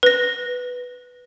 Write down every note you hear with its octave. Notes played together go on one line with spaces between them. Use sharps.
B4 A#6